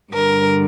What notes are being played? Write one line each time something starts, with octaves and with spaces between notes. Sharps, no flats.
G2 D3 A#4